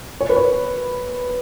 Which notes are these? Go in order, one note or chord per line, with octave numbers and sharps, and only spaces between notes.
C#5
B4
C#5